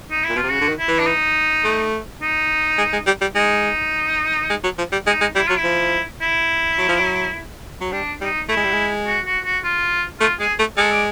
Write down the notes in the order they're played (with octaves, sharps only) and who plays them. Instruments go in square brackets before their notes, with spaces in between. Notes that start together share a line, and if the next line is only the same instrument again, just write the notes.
[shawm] D#4
E4
[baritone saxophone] A#2
[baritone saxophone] B2 [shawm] F4
[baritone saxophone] C3
[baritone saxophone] C#3 [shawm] F#4
[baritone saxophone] D3
D#3
[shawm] E4
[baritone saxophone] E3
[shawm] D4
D#4
[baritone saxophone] A3
[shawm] D#4
[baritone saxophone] G#3
G#3
G3
G3
[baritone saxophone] G#3 [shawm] D#4
[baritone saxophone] G#3
F#3
F3
G3
[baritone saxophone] G#3 [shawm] D#4
[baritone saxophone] G#3
[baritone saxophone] G3 [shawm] E4
[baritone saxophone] F#3 [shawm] F4
[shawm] E4
[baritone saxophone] F3
[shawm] E4
[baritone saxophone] F#3
F3
F#3
F#3
[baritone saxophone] G3 [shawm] D4
[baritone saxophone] G3 [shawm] D#4
[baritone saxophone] A3 [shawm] E4
[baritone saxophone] G#3
G3
G#3
[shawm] F#4
F#4
F#4
F4
[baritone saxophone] A3 [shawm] F4
[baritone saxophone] G#3 [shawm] G#4
[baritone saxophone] A3
[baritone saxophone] G#3 [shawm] A4
[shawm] D5